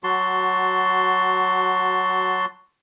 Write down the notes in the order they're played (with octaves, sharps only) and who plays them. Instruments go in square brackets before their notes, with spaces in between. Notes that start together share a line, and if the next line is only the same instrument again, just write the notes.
[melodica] F#3 F#4 A5 C6